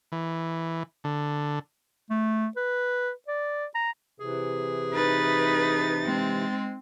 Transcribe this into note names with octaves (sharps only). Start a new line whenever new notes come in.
E3
D3
A3
B4
D5
A#5
C3 E3 G#4
D#4 B4 A6
G#3 C4